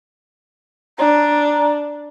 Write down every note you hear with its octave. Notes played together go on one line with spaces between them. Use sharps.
D4 A#5